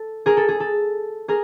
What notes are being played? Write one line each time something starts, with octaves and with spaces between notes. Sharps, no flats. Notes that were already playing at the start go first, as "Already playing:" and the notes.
Already playing: A4
G#4 A#4
A4
G#4
A4
G#4 A#4